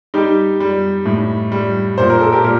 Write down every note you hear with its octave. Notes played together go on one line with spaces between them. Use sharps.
G3 D#4 G4
G3
A2
G3
A#2 C5
A#4
A4
G4 A#4
A#2 G4 A#4